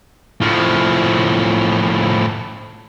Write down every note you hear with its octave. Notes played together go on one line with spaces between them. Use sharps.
A2 F3